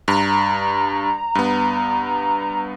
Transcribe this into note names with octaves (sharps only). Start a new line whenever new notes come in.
G2 A#5
G2 B3